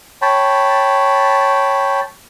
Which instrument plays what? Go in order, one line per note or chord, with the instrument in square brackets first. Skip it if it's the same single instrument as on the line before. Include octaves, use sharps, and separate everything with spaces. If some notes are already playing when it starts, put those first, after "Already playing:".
[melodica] C#5 G5 A5 B5